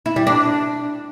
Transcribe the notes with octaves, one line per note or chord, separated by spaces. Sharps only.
E4
G3
D4